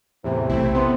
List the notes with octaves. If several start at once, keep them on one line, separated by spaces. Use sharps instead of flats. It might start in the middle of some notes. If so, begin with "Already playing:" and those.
E2 A2 C3 E3
B1 A3 C4 E4
B3 C4 C5 C6